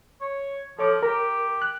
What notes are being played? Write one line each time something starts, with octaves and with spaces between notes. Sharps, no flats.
C#5
F3 A4 C#5 D6
G4 A#4
F#6